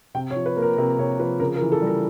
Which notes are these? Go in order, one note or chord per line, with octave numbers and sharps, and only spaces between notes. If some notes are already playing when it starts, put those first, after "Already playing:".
C3 G5
C#5
F3
B4
A#3
A#4
C3 A#4
C3 C#5
F3 B4
C#3 A#4
A#4
E3
A4
G3
A#4